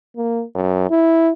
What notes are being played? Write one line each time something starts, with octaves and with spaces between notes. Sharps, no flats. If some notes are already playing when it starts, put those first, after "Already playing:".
A#3
F#2
E4